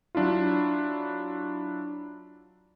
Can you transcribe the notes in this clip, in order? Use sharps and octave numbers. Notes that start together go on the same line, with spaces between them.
F#3 D4 E4 F4